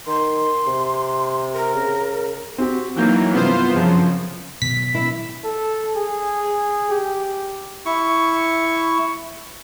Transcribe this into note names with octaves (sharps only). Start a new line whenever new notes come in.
D#3 C6
C3
A#4
C#3
C4 F#4 G4
D#3 E3 F#3 A#3 G6
G2 C3 E3 B3 F4 C5
F#2 C#3 F3
B2 D#3 F#3 B6
E4
A4
G#4
G4
E4 C#6